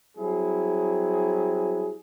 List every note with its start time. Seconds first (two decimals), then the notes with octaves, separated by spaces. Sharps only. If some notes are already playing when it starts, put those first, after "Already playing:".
0.17 F#3 G3 C4 E4 G#4